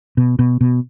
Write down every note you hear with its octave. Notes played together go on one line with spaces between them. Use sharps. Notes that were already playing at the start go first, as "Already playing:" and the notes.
B2
B2
B2